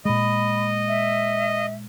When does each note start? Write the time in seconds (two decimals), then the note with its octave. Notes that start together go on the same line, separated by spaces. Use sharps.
0.05 A#2 G#3 D#5 B5
0.88 E5